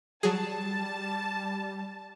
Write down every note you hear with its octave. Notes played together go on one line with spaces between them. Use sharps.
F#3 G3 G#4 A5